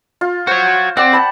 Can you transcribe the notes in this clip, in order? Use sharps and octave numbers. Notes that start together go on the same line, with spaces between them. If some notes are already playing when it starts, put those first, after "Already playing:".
F4
F#4 C5 C#5
C4 D5 F#5
G5 A5 B5